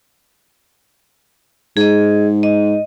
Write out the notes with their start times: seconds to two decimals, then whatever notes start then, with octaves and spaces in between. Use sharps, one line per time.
1.77 G#2 G#4 D#5
2.43 D#5